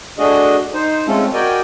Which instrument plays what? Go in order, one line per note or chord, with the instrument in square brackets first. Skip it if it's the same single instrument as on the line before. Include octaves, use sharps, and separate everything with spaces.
[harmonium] A3 D4 F#4 G#4 D#5
D#4 C5
G#3 A3 C4 C#4 F4 A4
F#4 A#4 D5 D#5 G5 G#5